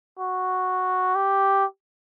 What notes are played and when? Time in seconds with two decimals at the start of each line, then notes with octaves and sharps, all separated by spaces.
0.20 F#4
1.15 G4